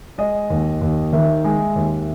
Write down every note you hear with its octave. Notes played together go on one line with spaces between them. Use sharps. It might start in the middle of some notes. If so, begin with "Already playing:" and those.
G#3 D#5
D#2
D#2
D#3 E5
G#3
D#2